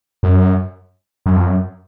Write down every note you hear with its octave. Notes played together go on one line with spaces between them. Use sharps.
F#2
F#2
F2
F#2